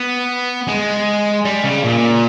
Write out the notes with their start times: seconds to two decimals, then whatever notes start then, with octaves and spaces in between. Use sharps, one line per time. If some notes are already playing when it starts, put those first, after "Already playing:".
Already playing: B3
0.68 G#3
1.45 G3
1.64 C#3
1.84 A#2